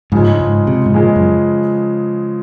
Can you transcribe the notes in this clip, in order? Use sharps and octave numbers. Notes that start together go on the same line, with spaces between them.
G#2 C#3 F3 G#3
G#2
C3
G#2
A#2 C#3 F3 G#3
F#2